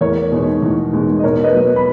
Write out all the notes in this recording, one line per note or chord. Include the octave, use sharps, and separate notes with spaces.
E2 A#4 C#5
B2 G#3 D#4
E2
B2 G#3 D#4
D#5
B2 A#4 C#5
B4 D#5
F#3 B3
B5